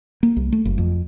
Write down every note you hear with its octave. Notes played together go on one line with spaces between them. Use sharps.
A#3
C2
A3
F#1
F2